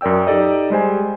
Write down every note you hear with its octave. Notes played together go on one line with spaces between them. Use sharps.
F#2 A#4 D5 G5 E6
D#4 G4 A4 D5 D#5
G3 G#3 C5 G#5